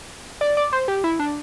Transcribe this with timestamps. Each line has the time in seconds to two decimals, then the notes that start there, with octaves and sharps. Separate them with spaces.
0.41 D5
0.57 D5
0.73 C5
0.88 G4
1.04 E4
1.19 D4